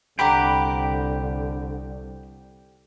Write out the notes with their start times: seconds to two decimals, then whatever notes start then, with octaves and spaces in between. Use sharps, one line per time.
0.19 C2 D3 G4 F#5 G5 A#5 B5 D6